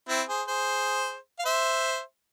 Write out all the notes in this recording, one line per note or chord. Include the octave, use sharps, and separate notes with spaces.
C4 E4
G#4 C5
G#4 C5
F5
C5 E5